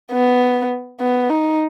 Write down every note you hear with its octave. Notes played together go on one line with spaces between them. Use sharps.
B3
B3
D#4